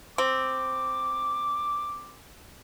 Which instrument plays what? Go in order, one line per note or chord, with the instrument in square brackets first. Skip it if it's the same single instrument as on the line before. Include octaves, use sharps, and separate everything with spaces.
[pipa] C4 [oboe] D6